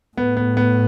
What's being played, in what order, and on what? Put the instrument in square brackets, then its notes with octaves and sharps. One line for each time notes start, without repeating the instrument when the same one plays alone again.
[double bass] A2 [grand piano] B3
[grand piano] B3
B3